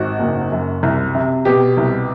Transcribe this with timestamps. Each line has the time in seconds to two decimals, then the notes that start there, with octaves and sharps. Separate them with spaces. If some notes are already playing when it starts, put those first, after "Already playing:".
Already playing: G#1 F#4
0.20 F#1
0.52 F#2
0.83 C2
1.15 C3
1.45 B2 G4
1.77 C2